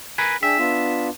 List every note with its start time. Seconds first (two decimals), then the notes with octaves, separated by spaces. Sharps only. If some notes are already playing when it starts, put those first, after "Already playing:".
0.18 A#4 B4 G#5
0.43 D4 G#4 E5 G5
0.59 B3 D4 F4